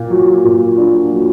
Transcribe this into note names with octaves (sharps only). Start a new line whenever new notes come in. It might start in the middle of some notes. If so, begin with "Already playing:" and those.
Already playing: A#2
F#3
A#2
D4
F#3